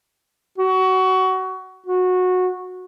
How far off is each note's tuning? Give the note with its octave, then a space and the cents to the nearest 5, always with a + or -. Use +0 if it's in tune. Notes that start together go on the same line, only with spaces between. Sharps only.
F#4 +20
F#4 -15